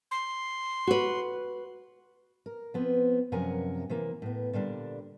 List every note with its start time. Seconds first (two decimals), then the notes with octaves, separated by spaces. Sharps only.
0.11 C6
0.87 F#4 B4
2.46 A#4
2.74 F3 B3 C4
3.32 F#2 C3 F3 A#4 F#5 G#5
3.90 C3 E3 A#3
4.22 A2 B3
4.53 A#2 D3 G3 D4